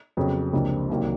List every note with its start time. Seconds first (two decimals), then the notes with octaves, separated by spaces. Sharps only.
0.17 F2 C#3 F#3 B3
0.53 C#2 C3 F3 A#3 D4
0.89 C2 C3 D#3 F#3 A#3